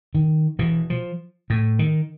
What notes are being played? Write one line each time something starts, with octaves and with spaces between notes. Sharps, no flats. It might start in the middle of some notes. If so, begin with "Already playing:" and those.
D#3
B2 E3
F3
A2
D#3